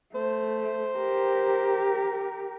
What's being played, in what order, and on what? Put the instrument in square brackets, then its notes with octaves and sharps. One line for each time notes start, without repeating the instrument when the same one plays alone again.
[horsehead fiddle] A3 [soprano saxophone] C5
[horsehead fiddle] G4 A#4